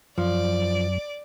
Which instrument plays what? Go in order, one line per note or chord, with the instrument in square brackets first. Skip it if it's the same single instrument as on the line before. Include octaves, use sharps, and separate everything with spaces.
[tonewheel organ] F#2 [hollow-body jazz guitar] F3 [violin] D5